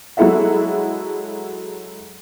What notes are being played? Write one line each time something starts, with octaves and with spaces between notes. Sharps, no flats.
F#3 G#3 E4 A4 E5 F#5